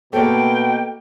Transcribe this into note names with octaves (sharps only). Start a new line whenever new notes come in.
B2 A3 A#3 G5